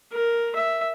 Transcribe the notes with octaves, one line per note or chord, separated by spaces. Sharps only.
A#4
E5